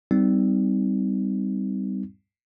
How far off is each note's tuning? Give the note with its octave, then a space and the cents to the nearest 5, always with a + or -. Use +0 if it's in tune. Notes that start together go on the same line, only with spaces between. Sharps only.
G3 +0 C4 -30 D#4 +5